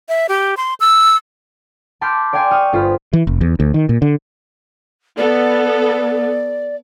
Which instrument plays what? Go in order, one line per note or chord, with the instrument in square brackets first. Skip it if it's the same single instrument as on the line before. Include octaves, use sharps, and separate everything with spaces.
[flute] E5
G4
C6
E6
[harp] A5 B5 C6 D6 F6 G6
D5 F5 G5 G#5 C6
C#6 D#6 F6
G1 F4 C5 B5 F6
[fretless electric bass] E3
F1
E2
D2
D#3
A#2
D3
[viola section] B3 A4 [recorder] D5